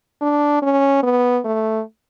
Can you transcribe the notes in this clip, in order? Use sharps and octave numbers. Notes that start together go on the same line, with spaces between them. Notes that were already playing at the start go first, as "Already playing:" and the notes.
D4
C#4
B3
A3